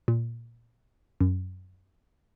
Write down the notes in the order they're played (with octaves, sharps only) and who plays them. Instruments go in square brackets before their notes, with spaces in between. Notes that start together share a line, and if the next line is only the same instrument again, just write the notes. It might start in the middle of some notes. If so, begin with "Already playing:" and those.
[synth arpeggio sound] A#2
F#2